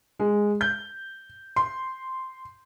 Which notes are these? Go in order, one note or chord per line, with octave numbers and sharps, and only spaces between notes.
G#3
G6
C6